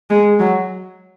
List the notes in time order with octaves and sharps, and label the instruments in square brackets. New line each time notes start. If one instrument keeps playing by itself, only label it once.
[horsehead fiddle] G#3
F#3